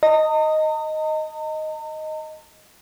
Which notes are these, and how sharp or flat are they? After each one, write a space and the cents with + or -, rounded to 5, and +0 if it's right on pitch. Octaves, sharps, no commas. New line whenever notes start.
D#5 +0 A#5 -45